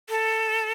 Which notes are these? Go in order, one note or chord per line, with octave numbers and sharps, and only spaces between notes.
A4